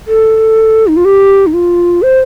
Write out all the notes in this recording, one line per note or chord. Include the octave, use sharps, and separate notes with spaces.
A4
D#4
F4
G4
D#4
F4
C5